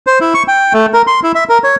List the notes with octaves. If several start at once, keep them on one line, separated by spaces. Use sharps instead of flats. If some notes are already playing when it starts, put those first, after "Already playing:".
C5
E4
C#6
G5
A3
A#4
C6
E4
E5
A#4
C#5